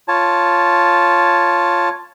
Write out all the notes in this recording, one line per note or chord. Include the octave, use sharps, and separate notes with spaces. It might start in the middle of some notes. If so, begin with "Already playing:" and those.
F4 C#5 A5